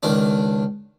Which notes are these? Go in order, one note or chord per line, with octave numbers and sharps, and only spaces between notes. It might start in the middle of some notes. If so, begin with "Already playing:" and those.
C#2 D#3 D4